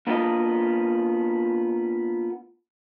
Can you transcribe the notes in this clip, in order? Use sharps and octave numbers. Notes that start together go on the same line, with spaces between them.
A#3 B3 D4 F4 A#4 D#5